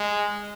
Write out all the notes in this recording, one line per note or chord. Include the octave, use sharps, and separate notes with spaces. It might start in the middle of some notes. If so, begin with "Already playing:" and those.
Already playing: G#3